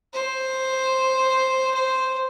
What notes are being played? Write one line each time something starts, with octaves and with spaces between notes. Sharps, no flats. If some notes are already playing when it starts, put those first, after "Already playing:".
C5
C5